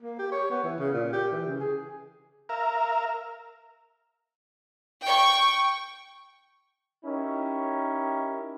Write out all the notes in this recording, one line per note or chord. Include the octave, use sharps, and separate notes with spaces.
A#3
G4
C#5
B3
E3
C#3
A#2
G4
E3
C#3
G#4
A#4 E5 F5
G5 C#6
C#4 D#4 E4 G4 A#4